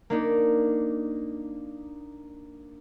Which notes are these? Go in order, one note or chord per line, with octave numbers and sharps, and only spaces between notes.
A#3 D4 D#4